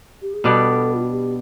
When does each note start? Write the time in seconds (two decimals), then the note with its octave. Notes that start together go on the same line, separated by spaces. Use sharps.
0.21 G4
0.33 G#4
0.44 B2 G3 B3 D4 A4
0.93 F4
1.02 F#4
1.10 G4